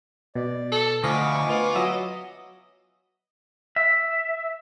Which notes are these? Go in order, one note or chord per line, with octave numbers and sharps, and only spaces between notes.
B2 D5
A4
D2 F3 D#5 F5 G#5 B5 C#6 D6
B3 F4
F#3 D#5 E5 E6
E5